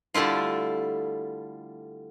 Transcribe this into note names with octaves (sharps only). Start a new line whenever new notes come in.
D3 G3 A3 E4 F4